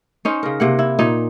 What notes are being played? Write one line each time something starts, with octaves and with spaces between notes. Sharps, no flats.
C#4 D#4 C5
C#3 A#4
C3 A#3 F#5
E4
A#2 D#4